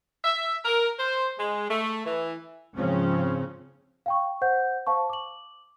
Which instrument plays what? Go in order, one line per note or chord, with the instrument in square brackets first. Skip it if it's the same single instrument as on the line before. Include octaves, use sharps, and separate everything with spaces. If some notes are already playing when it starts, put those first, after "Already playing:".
[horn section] E5
A#4
C5
G#3
A3
E3
[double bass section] G#2 C#3 F3 C4 C#4
[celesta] F5 G5 C#6
C5 F#5 G6
C5 F5 A5 C#6
D6 F#7